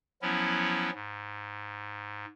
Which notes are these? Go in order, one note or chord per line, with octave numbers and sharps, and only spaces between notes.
F3 F#3 B3 C#4 E4
G#2